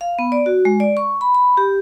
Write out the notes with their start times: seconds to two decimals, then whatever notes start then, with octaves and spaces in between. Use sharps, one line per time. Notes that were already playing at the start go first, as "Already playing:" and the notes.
0.01 F5
0.19 B3
0.32 D5
0.46 F#4
0.65 G#3
0.80 D5
0.97 C#6
1.21 B5
1.35 B5
1.57 G4